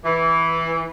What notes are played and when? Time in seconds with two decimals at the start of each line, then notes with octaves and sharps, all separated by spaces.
0.04 E3